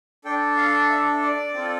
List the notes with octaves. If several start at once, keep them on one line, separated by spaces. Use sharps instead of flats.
D4 A4 G5
F5
E5
D5
C4 F4 A4